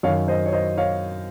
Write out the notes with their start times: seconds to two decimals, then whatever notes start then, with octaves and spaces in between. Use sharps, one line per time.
0.03 F#2 C#5 F5
0.08 D#3
0.28 C5 D#5
0.46 C#5
0.53 C5 D#5
0.77 C#5 F5